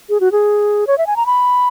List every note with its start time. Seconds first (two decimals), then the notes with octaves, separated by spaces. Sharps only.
0.09 G#4
0.20 F#4
0.32 G#4
0.87 C#5
0.98 E5
1.07 G#5
1.16 A#5
1.26 B5